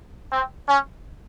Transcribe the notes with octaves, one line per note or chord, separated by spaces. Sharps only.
C4
C#4